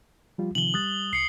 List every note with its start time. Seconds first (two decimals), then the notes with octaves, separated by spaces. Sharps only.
0.38 F3 G3 F4
0.55 C3 D#3 F3 F#7 G7
0.74 G3 D#6 F#6 A6
1.13 C2 C7 C#7